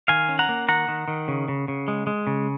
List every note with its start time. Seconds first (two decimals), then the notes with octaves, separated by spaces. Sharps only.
0.08 D#3 F5 G#5
0.29 C#4
0.39 F#5 A#5
0.49 A#3
0.68 D#3 F#5 A#5
0.88 D#3
1.08 D#3
1.28 C#3
1.48 C#3
1.68 C#3
1.88 G#3
2.07 G#3
2.27 C#3